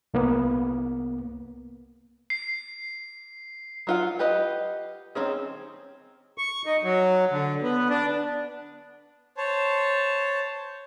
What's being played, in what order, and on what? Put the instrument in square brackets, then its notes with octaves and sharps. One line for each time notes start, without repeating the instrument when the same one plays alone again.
[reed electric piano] C2 A#3 B3
[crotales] C7
[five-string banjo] F#3 F4 F#5
G4 B4 D#5 F#5
D#3 F3 C4 C#4 G#4
[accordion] C#6
D#4
F#3
D3
B3
D4
[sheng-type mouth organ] C5 C#5 A5